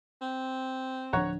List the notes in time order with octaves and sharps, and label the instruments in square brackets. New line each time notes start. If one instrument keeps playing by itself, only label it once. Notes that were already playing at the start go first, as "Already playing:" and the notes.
[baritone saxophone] C4
[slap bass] D1 F3 D4 [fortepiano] C#5 F#5 A#5